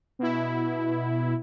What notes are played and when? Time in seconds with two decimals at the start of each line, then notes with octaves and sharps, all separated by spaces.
0.19 B2 E4